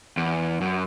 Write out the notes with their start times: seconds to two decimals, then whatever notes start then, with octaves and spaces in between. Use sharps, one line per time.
0.17 E2
0.61 F#2